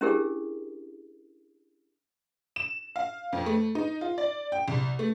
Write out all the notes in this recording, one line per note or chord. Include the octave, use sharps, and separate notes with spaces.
C#4 D4 E4 G4 G#4 A#4
E7
F5
F2
A3
D#4
F4
D5
G5
C2
A3